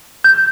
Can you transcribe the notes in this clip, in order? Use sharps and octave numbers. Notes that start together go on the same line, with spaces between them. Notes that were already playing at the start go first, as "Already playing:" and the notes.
G6